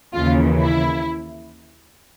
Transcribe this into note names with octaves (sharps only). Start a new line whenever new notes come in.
D#2 C#3 E3 F4
E4